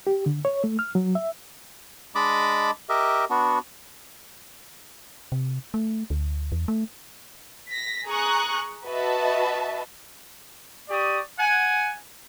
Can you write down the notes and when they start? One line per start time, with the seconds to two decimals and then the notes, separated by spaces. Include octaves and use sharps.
0.07 G4
0.26 D3
0.45 C#5
0.64 A3
0.79 F6
0.95 F#3
1.15 E5
2.15 G#3 D4 D#5 A5 B5 D6
2.89 G4 A#4 D#5 E5
3.30 B3 D4 F#4
5.32 C3
5.74 A3
6.10 D2
6.52 E2
6.68 A3
7.71 A#6 B6
8.06 G#4 A#5 C#6 D#6 F#6
8.86 F#4 B4 D#5 E5 A5
10.89 G4 D5 C#6 D#6
11.39 F#5 G#5